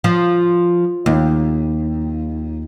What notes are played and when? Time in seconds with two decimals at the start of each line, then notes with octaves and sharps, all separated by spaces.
0.04 F3
1.06 D#2